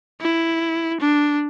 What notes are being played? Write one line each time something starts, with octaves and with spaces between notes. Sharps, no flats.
E4
D4